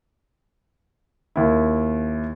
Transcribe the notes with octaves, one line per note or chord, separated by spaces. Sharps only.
D#2 E4